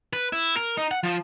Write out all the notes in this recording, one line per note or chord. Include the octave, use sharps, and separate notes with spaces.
B4
E4
A#4
D#4
F#5
F3